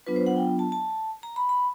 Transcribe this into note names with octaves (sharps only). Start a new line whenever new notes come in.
F#3 B3 D4 F4 B4
C5
F#5
G5
A5
A5
A#5
B5
B5